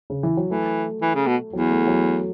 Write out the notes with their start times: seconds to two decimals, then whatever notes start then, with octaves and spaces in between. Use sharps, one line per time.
0.10 C#3
0.23 E3
0.37 F#3
0.50 E3 A3
1.02 E3
1.15 C#3
1.27 B2
1.53 E2 F#3
1.70 A3
1.87 F#3